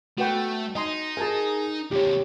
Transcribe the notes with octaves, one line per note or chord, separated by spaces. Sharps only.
A3 F#4 B4 G5
D#4 D#5 G#5 C6
G#4 A#4 G#5 A5
D#2 C3 G4 C#5